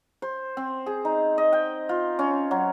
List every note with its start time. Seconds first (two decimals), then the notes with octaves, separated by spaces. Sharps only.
0.22 C5
0.57 C4
0.86 G#4
1.05 D#4
1.38 D#5
1.53 G5
1.89 F4
2.19 C#4
2.51 F#3